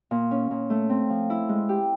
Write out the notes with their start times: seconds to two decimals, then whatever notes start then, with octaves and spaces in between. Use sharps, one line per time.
0.11 A#2
0.31 C#4
0.51 A#2
0.70 A3
0.89 C4
1.10 F3
1.30 E4
1.49 G#3
1.69 G4